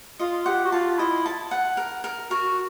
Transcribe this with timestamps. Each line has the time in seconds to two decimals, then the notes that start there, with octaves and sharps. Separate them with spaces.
0.19 F4 D#5
0.46 G4 F#5
0.65 F#4
0.72 F4 A5
0.98 E4 D#5
1.26 A5
1.51 F#5
1.77 A#4
2.04 A#4
2.30 F#4 A#4